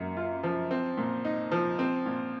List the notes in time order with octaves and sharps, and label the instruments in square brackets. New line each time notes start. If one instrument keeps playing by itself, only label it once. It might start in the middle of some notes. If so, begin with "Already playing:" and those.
Already playing: [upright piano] F#2 A#3
F4
F3
C4
A#2
D#4
F3
C4
A#2